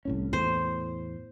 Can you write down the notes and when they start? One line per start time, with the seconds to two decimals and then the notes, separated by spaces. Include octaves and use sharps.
0.05 C2 A2 C#4
0.33 E2 A2 C5